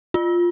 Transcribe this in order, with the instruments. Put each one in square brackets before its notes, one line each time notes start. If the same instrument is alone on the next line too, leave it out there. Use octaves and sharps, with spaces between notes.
[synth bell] F4